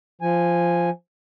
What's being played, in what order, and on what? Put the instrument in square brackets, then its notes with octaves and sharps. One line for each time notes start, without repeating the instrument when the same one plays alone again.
[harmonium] F3 G#5